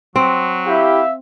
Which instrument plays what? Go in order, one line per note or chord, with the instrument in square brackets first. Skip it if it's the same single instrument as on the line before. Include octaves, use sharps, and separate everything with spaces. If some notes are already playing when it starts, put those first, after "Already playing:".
[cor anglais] F#3 [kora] C4
[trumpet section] E4 G4 [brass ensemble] E5 F5